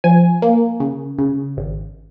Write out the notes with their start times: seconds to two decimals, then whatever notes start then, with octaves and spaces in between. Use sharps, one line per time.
0.04 F3 G#5
0.42 A#3
0.80 C#3
1.19 C#3
1.57 G#1